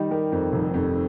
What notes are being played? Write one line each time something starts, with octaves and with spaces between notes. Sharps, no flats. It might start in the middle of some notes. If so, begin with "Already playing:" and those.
Already playing: D#3 G3 D#4
G3 G4 A#4
F2
F1
F2